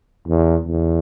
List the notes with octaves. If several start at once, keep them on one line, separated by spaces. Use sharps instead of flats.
E2
E2